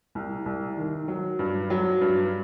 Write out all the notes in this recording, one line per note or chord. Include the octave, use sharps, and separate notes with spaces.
C2
C2
D#3
F#3
G2
F#3
G2